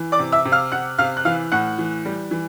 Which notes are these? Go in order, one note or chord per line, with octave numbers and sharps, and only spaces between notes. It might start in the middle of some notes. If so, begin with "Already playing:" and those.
Already playing: E3
D5 D6
C3
E5 E6
C3
F5 F6
C3 F#5 F#6
C3 F5 F6
F#6
E3 F5 F6
A2 F#5 F#6
E3
G3
E3